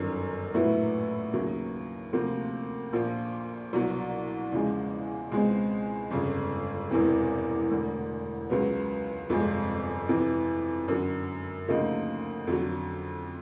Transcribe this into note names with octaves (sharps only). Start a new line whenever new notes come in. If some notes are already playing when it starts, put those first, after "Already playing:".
Already playing: G1 F#2 D#3 F#3
A#1 A2 F#3 B3 E4
D#2 C#3 F#3
D2 C3 F3 A#3
A#1 A#2 F3
C2 B2 F#3
E2 C#3 F3 G#3
C#2 B2 G#3 C4
G1 F2 C#3
E1 E2 C3 E3
E1 D2 D3
C#2 C#3 F#3 B3
G1 F2 C3 F3 G#3
F2 C3 E3
F#2 D3 F#3
D2 C#3 F3 A#3 D#4
F2 D3 F#3